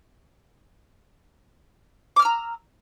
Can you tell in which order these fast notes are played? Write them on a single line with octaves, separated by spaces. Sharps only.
D6 F6 E6 A#5